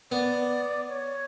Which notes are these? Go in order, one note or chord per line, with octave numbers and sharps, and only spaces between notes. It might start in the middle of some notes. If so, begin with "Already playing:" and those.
B3 D5
C#5